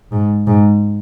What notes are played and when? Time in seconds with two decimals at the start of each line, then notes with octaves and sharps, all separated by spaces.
0.12 G#2
0.47 G#2